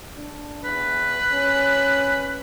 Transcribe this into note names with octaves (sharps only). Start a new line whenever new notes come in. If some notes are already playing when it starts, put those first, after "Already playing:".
D4
E2 B4
C#4